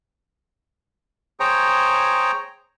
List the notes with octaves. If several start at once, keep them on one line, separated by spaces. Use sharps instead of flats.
G#4 C5 C#5 G5 A#5